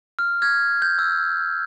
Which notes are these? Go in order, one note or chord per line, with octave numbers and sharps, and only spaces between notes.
F6
F6 G#6
G6
E6